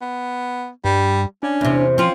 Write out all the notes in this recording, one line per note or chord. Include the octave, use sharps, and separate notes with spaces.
B3
G2 G3
C#4 D4
E2 C3
F3 C4 C#4 F4